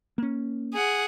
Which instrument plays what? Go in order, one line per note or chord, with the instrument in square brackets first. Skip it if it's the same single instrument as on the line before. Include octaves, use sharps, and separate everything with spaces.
[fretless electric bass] A#3 C#4
[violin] G#4 F#5